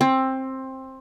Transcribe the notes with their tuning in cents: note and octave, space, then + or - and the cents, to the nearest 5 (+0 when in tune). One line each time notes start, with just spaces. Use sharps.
C4 +15